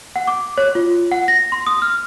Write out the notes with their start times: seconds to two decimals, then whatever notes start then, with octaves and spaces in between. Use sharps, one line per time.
0.16 F#5
0.28 D6
0.58 C#5
0.75 F4
1.12 F#5
1.28 A#6
1.52 C6
1.67 D#6
1.82 F6